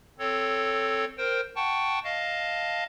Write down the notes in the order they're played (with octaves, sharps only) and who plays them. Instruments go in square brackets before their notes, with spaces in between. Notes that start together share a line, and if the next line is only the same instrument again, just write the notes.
[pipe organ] C4 A4 C#5
A#4 C5 G5
F#5 G5 A5 C#6
D#5 F5 A5